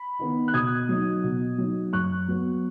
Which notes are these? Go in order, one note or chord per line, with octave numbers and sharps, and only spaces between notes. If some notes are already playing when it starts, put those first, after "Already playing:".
Already playing: B5
D#3 B3 D#4
F#6
B2 D#6 G#6
F#3 D#4
B2
F#3 D#4
F#2 C#6 F#6
F#3 B3